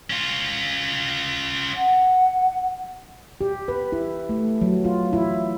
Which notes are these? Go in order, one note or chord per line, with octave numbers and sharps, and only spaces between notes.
C#4 F4
F#5
G4
B4
E4
A3
F#3
F4
E4